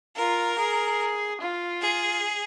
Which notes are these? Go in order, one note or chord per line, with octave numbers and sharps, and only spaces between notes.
F4 A#4
G#4
F4
G#4